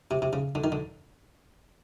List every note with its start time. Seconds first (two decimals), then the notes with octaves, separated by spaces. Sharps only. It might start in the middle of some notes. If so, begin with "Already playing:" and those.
0.11 C3
0.22 C3
0.33 C#3
0.55 D3
0.64 D#3
0.72 D3